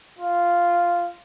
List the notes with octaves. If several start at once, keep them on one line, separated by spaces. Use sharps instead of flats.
F4